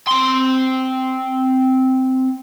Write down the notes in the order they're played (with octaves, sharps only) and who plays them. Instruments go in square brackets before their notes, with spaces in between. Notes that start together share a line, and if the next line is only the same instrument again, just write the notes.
[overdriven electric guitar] C4 C6